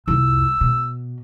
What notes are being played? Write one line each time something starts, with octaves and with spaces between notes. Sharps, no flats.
C2 F2 E6
B2